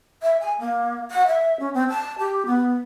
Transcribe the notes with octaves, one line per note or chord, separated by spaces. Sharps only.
E5
G#5
A#3
F#5
E5
C#4
C4
A5
G4
B3